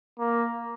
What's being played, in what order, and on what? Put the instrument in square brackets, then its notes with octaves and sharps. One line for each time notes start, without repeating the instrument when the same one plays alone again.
[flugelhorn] A#3